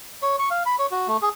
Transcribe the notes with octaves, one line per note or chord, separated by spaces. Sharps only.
C#5
C#6
F5
B5
C#5
F#4
A3
G#4